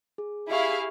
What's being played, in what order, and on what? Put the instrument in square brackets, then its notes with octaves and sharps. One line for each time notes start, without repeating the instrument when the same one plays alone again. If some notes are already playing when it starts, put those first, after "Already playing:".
[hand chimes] G#4
[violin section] E4 G#4 F5 [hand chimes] G4 E5 C#6